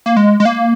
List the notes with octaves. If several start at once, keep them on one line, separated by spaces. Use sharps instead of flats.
A#3
G#3
G#3
A#3